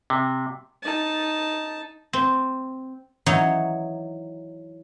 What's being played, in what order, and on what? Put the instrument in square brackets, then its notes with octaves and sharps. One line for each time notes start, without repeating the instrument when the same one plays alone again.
[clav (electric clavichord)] C3
[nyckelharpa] D#4 A5
[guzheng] C4
E3 F#3 D#4 C#5